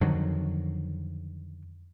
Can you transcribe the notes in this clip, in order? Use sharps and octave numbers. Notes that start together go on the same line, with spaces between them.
F2 D3 D#3 F#3